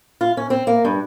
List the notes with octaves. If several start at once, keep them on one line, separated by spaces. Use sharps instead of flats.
F4
C#4
C4
A#3
G2